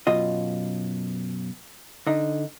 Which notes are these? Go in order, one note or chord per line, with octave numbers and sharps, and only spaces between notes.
F#2 B2 F4 D#5
D3 D#4